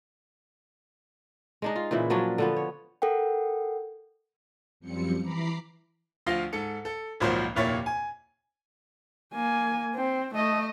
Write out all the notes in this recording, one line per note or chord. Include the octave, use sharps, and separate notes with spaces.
G#3 D4 D#4
F4
A#2 C#3 E3 E4
F3 F#3 C#4 D4
D3 F3 B3
C#5
A4 A#4 F#5 G5
F#2 F3 G3 C4 C#7
E3 A#5 B5 D6 C7
D2 F3 F4 F5 A#6 G7
G#2 A4 C#7
A4
G#1 C#2 A#2 F3 F#3 C5
F1 D#2 A#2 E4 C#5 A6
G#5
A#3 G#5
C4
A3 D#5